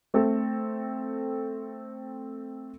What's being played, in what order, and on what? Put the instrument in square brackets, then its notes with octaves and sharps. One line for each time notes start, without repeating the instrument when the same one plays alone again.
[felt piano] A3 C4 A4